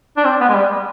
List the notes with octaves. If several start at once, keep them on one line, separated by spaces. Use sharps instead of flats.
D4
C4
B3
G#3
G3